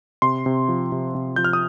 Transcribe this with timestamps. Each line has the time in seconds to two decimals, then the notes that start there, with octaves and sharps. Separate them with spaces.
0.22 C3 C6
0.46 C3
0.68 F3
0.92 C3
1.15 C3
1.36 F3 G6
1.44 F6
1.53 D#6